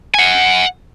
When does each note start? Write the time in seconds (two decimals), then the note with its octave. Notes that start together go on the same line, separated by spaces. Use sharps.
0.14 F#5 G#5